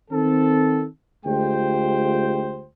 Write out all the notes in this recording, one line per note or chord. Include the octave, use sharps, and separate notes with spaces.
D#3 C4 A4
D2 G#3 F4 G4 C5 G5